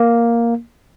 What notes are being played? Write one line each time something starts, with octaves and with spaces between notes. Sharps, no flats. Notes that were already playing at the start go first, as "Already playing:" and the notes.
Already playing: A#3